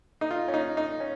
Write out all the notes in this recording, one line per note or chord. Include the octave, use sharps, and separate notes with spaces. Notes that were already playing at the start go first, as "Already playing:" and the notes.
D#4
F4
C#4
D#4
D#4
C#4